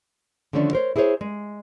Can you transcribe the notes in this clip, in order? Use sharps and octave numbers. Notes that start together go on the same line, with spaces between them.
D3 D#3 F3 A3 C#4 D4
A#4 C5 C#5
E4 G#4 A#4 C5 C#5
G#3